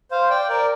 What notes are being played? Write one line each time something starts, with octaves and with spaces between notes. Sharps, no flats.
C5 F5
D5 G5
A#4 D5